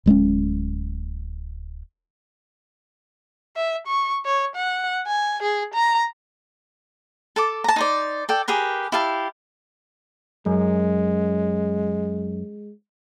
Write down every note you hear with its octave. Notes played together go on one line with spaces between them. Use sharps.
D1 G#3 A#3 C#4
E5
C#6
C#5
F#5
G#5
G#4
A#5
A4 A5 D6
A5 A#5
D#4 C5 D5
A4 D5 G5
G4 G#4 A#4 B4
E4 G4 F5 A5
F#2 G#3